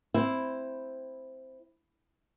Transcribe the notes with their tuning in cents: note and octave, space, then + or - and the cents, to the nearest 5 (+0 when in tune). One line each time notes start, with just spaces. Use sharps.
C4 +0 E4 +0